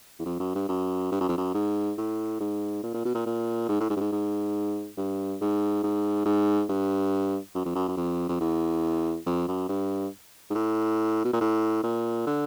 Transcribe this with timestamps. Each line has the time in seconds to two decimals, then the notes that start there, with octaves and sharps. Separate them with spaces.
0.19 E2
0.25 F2
0.40 F#2
0.55 G2
0.68 F#2
1.12 G2
1.20 F#2
1.29 F2
1.37 F#2
1.54 G#2
1.97 A2
2.40 G#2
2.83 A#2
2.94 A#2
3.05 B2
3.15 A#2
3.26 A#2
3.69 G#2
3.80 A2
3.90 G#2
3.96 G2
4.00 G#2
4.12 G#2
4.97 G2
5.41 G#2
5.83 G#2
6.25 G#2
6.69 G2
7.55 F#2
7.65 F2
7.75 F#2
7.88 F#2
7.97 F2
8.29 F2
8.41 E2
9.26 F2
9.48 F#2
9.69 G2
10.50 G#2
10.55 A2
11.25 B2
11.33 A#2
11.41 A2
11.83 A#2
12.27 D3